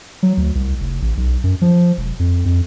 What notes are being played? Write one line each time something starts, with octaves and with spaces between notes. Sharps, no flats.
F#3
D2
C2
F1
A1
B1
F#2
F3
E1
F2
F2